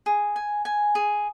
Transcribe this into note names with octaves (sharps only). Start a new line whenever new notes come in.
G#4
G#5
G#5
G#4